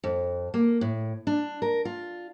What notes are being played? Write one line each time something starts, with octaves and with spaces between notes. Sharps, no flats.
F2
A#3
A2
D4
A#4
F4